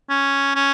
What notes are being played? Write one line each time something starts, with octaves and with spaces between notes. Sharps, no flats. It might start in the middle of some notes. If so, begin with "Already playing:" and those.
C#4
C#4